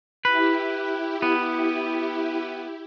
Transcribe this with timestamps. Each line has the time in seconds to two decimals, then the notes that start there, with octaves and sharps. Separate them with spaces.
0.25 E4 G4 B4
1.22 B3